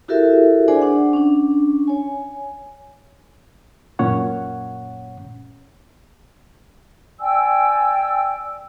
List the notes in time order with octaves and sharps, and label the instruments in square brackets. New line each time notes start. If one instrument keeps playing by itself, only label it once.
[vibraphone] E4 F#4 G4 A4 A#4 E5
D4 G#4 C5 D5 G#5
D4 F#5
C#4 D4
C#5 G#5
[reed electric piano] F#2 A#2 C#4 C#5 F#5
[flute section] D5 G5 G#5 E6